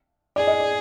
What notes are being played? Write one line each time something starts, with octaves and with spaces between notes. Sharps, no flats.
G#4 D5
D#5
D5